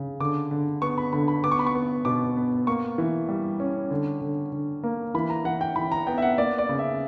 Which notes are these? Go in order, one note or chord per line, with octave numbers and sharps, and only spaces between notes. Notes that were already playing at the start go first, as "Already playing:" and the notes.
Already playing: C#3
D3 D6
D3
B3 C#6
B5
D3 B5
B5
B3 D6
C#6
B5
C#6
B3
B2 D6
B3
A#3 C#6
E3
G3
C#4
D3
D3
D3
A#3
E3 B5
A#5
E3 F#5
G5
E3 B5
A#5
B3 G5
E5
F#5
A#3 D5
D5
C#3
E5